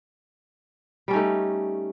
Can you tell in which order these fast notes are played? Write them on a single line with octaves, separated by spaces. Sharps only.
G3 C#4 D#4 A3